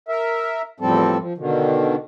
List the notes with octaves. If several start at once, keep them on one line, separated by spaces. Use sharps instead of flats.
A#4 E5
E2 A2 F3 G3 C4 A4
F3
B2 D3 D#3